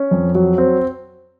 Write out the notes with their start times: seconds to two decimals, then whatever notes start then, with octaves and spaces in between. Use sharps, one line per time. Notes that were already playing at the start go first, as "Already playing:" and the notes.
Already playing: C#4
0.11 F2
0.35 F#3
0.58 C4